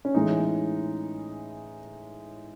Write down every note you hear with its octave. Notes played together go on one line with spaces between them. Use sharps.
C#4
A2 E3 G#3 D#4